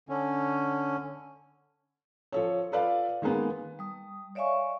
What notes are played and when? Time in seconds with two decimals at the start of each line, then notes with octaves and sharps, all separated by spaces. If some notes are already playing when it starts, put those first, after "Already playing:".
0.09 D3 C#4
2.32 F3 A4 C#5
2.72 F4 A4 B4 D5 F5
3.22 D#3 G#3 A#3 B3
3.79 G3 D#6
4.35 C#5 D5 E5 F5 G#5 C#6